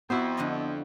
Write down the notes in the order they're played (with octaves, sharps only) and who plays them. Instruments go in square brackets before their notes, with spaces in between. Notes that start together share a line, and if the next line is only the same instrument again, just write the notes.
[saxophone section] F2 [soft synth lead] B3 [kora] E4 F#4 C5
[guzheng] D3 F3 D#5